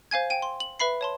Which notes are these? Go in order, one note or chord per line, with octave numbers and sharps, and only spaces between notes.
C5 F5 G#5 G#6
G5 D#7
C6
F#7
B4 E5 B5 C7
C#5 A5 C6